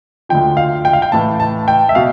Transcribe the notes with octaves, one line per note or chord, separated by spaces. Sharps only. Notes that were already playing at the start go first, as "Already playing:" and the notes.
D2 D3 F3 G5
F5
G5
F5
G5
A1 A2 E3 A5
A5
G5
E5
B2 F5